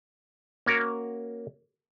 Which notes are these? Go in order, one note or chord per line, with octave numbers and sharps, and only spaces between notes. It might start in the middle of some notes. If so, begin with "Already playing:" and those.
A#3 C#4 F#4 A#4